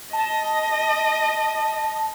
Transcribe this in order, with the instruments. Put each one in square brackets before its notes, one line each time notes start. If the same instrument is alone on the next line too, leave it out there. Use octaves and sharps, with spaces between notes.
[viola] D#5 [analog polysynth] A5